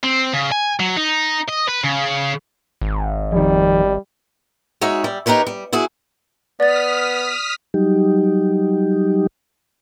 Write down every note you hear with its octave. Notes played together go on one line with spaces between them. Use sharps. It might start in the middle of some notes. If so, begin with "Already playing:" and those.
C4
C#3
G#5
F#3
D#4
D#5
B4
C#3
G#1
F2 D#3 G3
G#3 D#4 F#4 C#5 E5
G3
D#4 G4 A#4 B4 C#5
G3
E4 F#4 G#4
B3 D5 D#6 F6 A6 B6
F#3 G3 D#4 G4